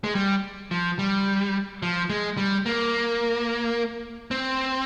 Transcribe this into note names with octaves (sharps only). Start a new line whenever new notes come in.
G#3
G3
F3
G3
F3
G#3
G3
A#3
C4